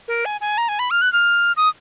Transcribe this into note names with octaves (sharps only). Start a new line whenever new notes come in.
A#4
G#5
G#5
A#5
G#5
B5
F6
F#6
F6
D#6